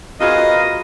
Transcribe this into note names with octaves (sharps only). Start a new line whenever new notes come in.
F4 F#4 G#4 A#4 B4 D#5 F5